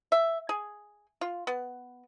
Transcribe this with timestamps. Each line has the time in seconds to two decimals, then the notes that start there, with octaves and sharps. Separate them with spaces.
0.12 E5
0.49 G#4
1.21 F4
1.47 B3